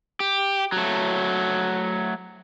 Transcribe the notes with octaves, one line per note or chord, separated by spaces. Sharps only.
G4
F#3 A3